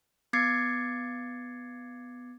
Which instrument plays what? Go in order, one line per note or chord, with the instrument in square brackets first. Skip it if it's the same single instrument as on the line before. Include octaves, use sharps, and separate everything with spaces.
[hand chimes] B3 D6 G#6 A6 C7 C#7